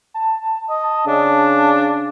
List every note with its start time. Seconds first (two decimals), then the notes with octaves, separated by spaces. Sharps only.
0.14 A5
0.69 D#5
0.83 A5
1.07 C#3 D4